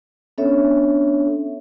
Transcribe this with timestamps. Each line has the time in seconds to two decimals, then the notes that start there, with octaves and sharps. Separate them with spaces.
0.38 B3 C#4 D4 A4 C#5 E5